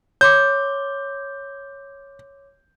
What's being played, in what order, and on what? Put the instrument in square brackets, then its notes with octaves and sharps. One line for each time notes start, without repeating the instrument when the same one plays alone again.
[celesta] C#5 C6 D6 [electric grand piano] G6